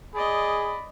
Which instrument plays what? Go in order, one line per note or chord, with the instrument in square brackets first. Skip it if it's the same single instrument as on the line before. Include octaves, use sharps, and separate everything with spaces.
[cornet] G#4 [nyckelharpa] D5 D#5 [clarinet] B5